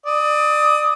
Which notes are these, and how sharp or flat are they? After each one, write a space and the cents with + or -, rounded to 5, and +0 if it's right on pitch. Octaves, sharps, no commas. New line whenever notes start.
D5 +30 D#6 +25